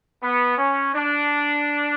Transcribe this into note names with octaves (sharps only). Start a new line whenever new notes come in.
B3
C#4
D4